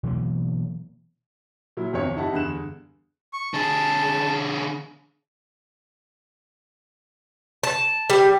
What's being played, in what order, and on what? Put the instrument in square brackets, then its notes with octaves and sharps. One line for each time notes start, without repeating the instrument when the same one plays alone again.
[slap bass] B2 E3 F#3 A#3
[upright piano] A#2 F#3 E4
G1 E2 C3 D4 C#5 C#7
D#4 E4 G4 F#5 A5
E2 G2 D3 G#4 F#6 E7
[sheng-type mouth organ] C#6
[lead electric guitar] D3 G#4 [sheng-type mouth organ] A5
[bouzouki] A5
G3